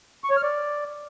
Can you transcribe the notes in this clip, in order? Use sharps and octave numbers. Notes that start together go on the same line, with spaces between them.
C#6
C#5
F6
D5